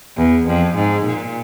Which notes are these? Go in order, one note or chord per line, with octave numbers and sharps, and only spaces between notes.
E2
F2
G#2
A#2